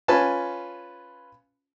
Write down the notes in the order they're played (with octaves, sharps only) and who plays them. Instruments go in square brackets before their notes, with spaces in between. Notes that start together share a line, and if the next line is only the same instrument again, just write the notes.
[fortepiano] C#4 F4 B4 G#5 A5